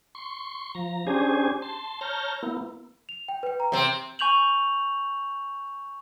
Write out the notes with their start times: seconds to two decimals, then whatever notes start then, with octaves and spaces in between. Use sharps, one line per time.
0.15 C6 C#6
0.75 F3 A#5
1.07 C#4 D4 G4 G#4 C5 G#5
1.62 A5 C6
2.01 C#5 A5 A#5 F6 G6
2.43 A#3 B3 E4
3.09 F7
3.28 G5
3.43 B4 G5
3.60 A#5
3.72 C3 C4
4.19 G#5 C#6 G6 F7 F#7